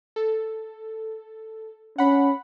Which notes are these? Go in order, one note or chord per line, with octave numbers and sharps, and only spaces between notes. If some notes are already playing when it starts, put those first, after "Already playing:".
A4
C#4 F#5 B5